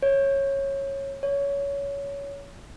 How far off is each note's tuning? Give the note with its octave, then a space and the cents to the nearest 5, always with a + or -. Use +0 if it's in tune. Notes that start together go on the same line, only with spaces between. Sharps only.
C#5 -15
C#5 +20